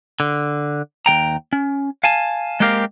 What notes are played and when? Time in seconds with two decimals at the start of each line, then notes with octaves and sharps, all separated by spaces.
0.20 D3
1.06 D#2 G#3 G5 A#5
1.53 C#4
2.04 F5 G#5 A5
2.60 G#3 A#3 C4 G4 A#4 F5